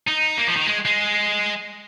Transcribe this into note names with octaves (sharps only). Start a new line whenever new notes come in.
D#4
A#3
F3
D#3
G#3
G#3